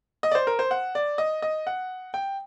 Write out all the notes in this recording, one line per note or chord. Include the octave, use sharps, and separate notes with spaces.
D#5
D5
C5
A#4
C5
F#5
D5
D#5
D#5
F#5
G5